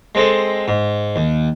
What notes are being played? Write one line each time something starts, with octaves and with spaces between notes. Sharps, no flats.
G#3 C4 A4 D#5
G#2
D#2